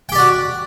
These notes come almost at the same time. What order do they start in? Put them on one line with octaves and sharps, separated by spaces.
G5 G4 D5 F#4